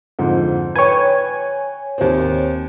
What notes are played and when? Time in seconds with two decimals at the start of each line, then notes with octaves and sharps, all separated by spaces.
0.19 F2 G#2 D3
0.76 B4 C#5 G5 G#5
1.98 D#2 C4